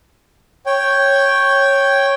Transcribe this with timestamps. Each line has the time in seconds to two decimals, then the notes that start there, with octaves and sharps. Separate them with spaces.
0.66 C#5 G5